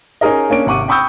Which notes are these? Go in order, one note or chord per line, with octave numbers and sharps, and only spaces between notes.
C#4 D#4 G#4 A#4 D#5
A#3 C#4 D4 D7
G#1 C3 F#5 C#6 D6 D#7
G5 B5 C#6 D#6 E6 G6